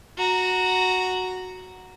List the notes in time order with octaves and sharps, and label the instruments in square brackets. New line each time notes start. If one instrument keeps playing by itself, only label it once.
[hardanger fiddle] F#4 A#5